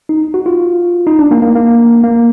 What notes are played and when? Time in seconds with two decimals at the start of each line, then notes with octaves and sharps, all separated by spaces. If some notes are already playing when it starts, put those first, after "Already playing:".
0.09 D#4
0.34 F#4
0.46 F4
1.07 D#4
1.19 D4
1.31 A#3
1.42 A#3
1.55 A#3
2.04 A#3